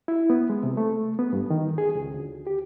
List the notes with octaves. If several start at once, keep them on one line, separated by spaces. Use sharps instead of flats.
E4
B3
G#3
C3
A3
B3
G2
D#3
G#4
C#2
D2
G4